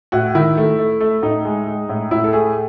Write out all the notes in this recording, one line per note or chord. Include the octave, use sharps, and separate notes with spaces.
A2 F#4
D#3 E4
A3
A3
A3
A2 D#4
G#3
G#3
A2
A2 E4
A4
A3 G#4